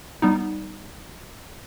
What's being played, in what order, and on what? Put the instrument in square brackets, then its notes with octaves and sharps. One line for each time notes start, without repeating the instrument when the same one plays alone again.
[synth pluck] G3 B3 D#4